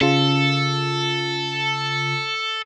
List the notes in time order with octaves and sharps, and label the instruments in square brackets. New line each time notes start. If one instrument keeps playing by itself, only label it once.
[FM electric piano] C#3 F4 [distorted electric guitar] A4